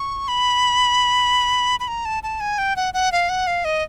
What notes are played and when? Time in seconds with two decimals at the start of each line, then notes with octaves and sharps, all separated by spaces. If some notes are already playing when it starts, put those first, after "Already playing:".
Already playing: C#6
0.28 B5
1.80 B5
1.88 A#5
2.05 A5
2.23 A5
2.40 G#5
2.58 G5
2.76 F#5
2.94 F#5
3.12 F5
3.29 F#5
3.47 F5
3.65 D#5